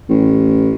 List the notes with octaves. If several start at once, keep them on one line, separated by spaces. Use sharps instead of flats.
A1